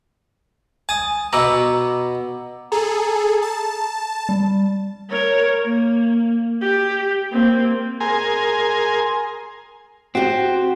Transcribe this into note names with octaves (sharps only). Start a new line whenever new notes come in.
G#5 A5 D#6
B2 B3 A#5 D6 E6
G#4 A4 A#5
A5
G3
A#4 C#5
A#3
G4
A#3 C4
G#4 A#4 G#5 C6
C4 F#4 G4